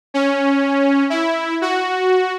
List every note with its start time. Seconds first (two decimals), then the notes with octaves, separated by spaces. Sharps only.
0.14 C#4
1.10 E4
1.62 F#4